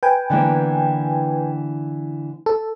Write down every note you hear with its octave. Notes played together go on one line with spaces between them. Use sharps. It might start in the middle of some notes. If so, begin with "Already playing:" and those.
B4 G5 G#5
D3 E3 A#3
A4